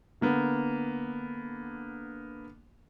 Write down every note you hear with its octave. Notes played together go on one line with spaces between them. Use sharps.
D3 A#3 B3